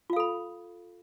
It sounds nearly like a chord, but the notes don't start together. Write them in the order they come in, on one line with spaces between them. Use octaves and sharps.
F4 F5 A4 B5